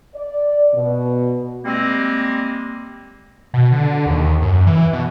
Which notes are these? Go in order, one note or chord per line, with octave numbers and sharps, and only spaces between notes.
D5
B2
G3 G#3 A#3 C4
B2
D3
D#2
F#2
E3
B2